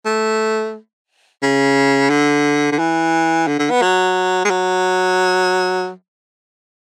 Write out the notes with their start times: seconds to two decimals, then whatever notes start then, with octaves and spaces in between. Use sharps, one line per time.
0.06 A3
1.43 C#3
2.10 D3
2.72 D3
2.79 E3
3.48 D3
3.59 D3
3.70 B3
3.82 F#3
4.45 G#3
4.50 F#3